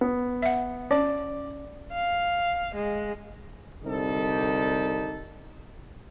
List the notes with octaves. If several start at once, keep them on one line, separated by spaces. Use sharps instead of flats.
B3
E5 F#5
C#4 D5
F5
G#3
C2 D3 D#4 G4 A4